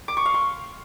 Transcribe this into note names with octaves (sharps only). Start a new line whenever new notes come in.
D6
C#6
F5
C6